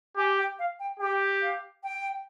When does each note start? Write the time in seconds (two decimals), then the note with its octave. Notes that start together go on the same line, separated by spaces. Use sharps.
0.17 G4 G#5
0.38 G5
0.58 F5
0.79 G5
0.99 G4 G5
1.41 F5
1.83 G5